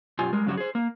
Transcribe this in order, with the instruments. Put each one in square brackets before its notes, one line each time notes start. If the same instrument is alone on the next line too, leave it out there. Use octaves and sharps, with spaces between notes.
[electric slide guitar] F#2 B2 F4 G4 G#5
G3 G#3 A#4
G2 C#3 F#3 C#4 F#4 G4
G#4 C5
A#3